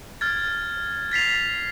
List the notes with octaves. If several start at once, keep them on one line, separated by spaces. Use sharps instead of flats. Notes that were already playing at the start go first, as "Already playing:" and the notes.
F6 G#6 A6
A6 B6 C7 F7